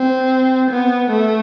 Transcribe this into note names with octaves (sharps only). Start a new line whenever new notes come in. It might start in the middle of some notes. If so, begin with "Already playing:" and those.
Already playing: C4
B3
A3